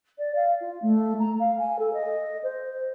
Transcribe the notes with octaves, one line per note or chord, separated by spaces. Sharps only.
D5
F5
F4
A3
A#5
F5
G#5
A4
D#5
C5